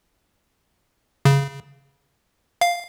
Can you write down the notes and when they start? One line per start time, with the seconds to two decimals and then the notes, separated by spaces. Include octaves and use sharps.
1.25 C#3
2.61 F5